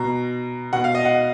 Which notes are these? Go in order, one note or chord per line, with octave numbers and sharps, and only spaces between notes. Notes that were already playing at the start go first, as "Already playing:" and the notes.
Already playing: B2 A#5
B2 F#5
F5
D#5
F#5